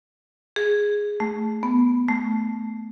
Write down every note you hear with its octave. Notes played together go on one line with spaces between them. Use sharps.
G#4
A3
B3
A3